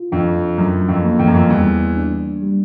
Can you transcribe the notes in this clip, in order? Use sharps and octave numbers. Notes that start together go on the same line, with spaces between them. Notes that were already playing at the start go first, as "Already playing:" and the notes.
Already playing: F4
F2 D4
F#2 F#3
F2
A#3
F2
F#2
F2
E2 G3
D4
G3